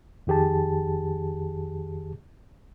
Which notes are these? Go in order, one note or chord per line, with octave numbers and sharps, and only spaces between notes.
F2 D#3 G4 G#4 A5